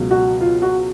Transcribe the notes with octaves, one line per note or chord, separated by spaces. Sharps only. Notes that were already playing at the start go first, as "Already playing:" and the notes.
Already playing: C#2 B2 F#3
F#4
F4
F#4